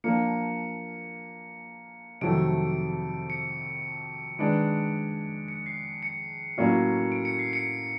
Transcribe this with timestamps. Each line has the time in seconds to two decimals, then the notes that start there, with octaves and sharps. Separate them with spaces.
0.04 F3 A#3 D4 F4 C#7
2.21 F2 C3 D#3 F#3 A3 D7
3.30 C#7
4.39 D#3 G#3 B3 D4 D7
5.48 C#7
5.66 C7
6.03 C#7
6.57 A2 F#3 A#3 C#4 F4
7.12 D7
7.25 C#7
7.39 C7
7.53 C#7